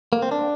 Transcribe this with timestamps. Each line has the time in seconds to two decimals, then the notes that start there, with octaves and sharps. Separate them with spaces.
0.13 A#3
0.22 C4
0.32 D4